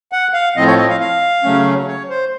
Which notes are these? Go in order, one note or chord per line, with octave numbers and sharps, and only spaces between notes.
F#5
F5
A2 F3 C4 D#5
C#5
D#5
F5
F5
C#3 F#3 A3 C#4
C#5
C5